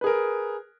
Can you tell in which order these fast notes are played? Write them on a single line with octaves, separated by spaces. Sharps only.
B4 G#4 A#4